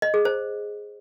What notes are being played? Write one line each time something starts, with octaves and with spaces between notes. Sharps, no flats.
D#5
G#4
C5